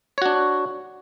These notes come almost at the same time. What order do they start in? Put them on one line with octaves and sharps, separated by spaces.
C#5 F#4 D4